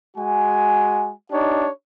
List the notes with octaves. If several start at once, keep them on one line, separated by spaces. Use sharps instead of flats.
G#3 F#4 G#5
D4 D#4 G4 C#5